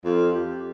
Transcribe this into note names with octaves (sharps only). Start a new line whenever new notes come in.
F2 F4
G4